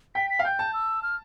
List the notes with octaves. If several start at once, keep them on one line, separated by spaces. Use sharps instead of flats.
G5 B6
B6
F5
G5 G6
A5
E6
F6